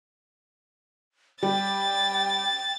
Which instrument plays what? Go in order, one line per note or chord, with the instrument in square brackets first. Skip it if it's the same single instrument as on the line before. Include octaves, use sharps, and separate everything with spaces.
[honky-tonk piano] G3 [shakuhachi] G5 [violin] A6